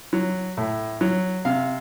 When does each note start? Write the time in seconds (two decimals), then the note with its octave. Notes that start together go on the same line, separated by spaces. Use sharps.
0.13 F#3
0.57 A2
1.01 F#3
1.45 C3 F5